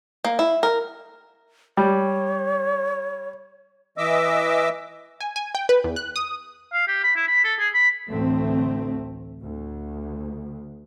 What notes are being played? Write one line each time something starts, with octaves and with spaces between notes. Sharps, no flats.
A#3
E4
A#4
G3 C#5
E3 D#5 E5 D6 E6
G#5
G#5
G5
B4
E2
F#6
D#6
F5
G4
B5
E4
B5
A4
G#4
B5
A1 D2 A3 C4
D2